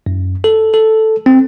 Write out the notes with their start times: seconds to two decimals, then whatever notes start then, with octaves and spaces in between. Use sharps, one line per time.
0.06 F#2
0.44 A4
0.74 A4
1.26 C4